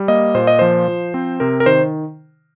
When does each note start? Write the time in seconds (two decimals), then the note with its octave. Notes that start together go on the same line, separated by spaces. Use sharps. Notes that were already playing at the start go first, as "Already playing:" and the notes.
Already playing: G3
0.08 A#3 D#5
0.35 A#2 C5
0.47 D#5
0.59 F3 C5
0.88 F3
1.14 C4
1.40 C3 A#4
1.60 A#4
1.66 D#3 C5